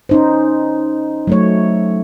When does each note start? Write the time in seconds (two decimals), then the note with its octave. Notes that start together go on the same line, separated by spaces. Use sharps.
0.09 C#4 D#4 C5
1.27 F#3 A3 C#5